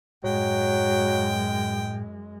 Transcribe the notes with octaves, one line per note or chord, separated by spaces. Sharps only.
F#2 A2 F#3 G#3 G5